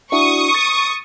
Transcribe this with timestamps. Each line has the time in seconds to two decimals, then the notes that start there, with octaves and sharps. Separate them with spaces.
0.12 D4 E4 F#4 C#6 D#6
0.54 A6